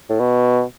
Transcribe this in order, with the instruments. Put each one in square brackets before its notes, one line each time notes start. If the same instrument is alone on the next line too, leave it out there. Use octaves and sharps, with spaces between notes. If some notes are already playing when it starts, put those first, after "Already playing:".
[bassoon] A2
B2